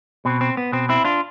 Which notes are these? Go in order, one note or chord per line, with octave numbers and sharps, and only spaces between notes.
B2 C4
C4
B3
B2 C4
C4 E4
D4 F4